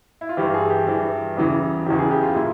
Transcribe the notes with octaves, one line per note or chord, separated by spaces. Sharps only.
E4
F4
G2 E3 G4
G#4
G4
G2 E3
E2 C#3 E3
E2 C#3 E3 G4
G#4
G4
F4
A#2 E4